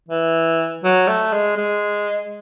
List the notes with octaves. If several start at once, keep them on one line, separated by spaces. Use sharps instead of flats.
E3
F#3
A3
G#3
G#3